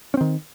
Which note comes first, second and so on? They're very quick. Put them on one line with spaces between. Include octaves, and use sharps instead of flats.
C#4 C4 D#3